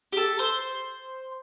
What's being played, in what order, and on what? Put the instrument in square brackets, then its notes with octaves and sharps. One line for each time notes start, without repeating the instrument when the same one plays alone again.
[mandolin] G4
A4
C5